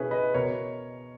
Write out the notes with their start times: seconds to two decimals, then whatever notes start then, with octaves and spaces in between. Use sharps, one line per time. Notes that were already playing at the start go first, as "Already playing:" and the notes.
Already playing: B2 C#4 E4 G#4 B4
0.11 B4 D#5
0.34 B2 A#4 C#5